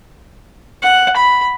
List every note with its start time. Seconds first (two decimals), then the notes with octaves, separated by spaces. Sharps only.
0.83 F#5
1.16 B5